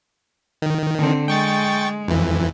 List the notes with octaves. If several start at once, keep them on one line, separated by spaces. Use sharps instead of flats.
D#3
D3 C4
G#3 G5 C#6 A6
F2 E3